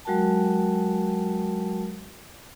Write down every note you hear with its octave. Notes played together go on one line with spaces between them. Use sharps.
F#3 G#3 F#4 A#4 G5 A5